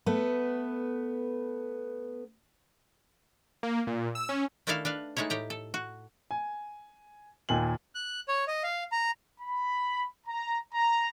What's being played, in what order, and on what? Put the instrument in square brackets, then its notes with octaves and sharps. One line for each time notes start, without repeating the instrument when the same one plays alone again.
[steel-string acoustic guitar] A3 B3 B4
[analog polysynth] A#3
A#2
E6
C#4
[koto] D#3 A3 D4 E4 A4 F5
D4 B4 F5
G#3 A3 D#4 E4 C#5
A2 G4 A#5
A4
F#4
[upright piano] G#5
D#2 A#2 G#5 F#7
[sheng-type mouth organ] F#6
C#5
D#5
F5
A#5
[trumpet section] B5
A#5
A#5